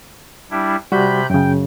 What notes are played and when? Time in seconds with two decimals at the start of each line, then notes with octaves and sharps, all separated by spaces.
0.51 G3 D4 E4
0.92 C3 G3 F#4 B5 G6
1.30 F#2 C#3 G5